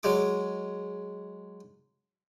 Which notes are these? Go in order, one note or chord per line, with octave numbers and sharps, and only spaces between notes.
F#3 G#3 D6